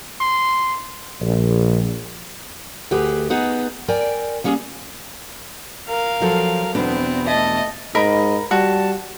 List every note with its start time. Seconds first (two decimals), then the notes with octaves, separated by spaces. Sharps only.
0.21 C6
1.21 A#1
2.91 D2 G4 G#4 B4
3.30 B3 D#4 G#4 B4
3.88 A#4 D5 G5 G#5
4.44 G3 A#3 C#4 G#4
5.88 A#4 F5
6.22 F3 F#3 A4
6.75 E2 B2 B3 C4 D4
7.27 A3 D#5 E5 A5
7.95 G#2 A#4 D#5 B5
8.51 G3 F#4 A5